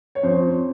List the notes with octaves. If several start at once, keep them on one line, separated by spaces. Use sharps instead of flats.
C#5
F2 C5